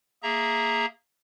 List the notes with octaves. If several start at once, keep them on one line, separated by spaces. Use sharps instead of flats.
A#3 G#4 E5 A#5